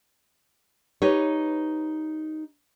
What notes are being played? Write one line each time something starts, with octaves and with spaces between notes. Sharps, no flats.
D#4 G4 B4 C#5